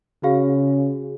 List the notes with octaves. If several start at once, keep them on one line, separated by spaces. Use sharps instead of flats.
C#3 F#4 G#4 F5